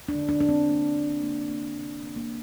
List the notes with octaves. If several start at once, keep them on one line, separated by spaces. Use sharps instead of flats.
D4
D3
D4
D3 D4
C4
A#3
A#3
A#3
A#3
C3
A#3
A#3